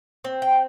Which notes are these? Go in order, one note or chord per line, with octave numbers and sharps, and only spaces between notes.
C4
G5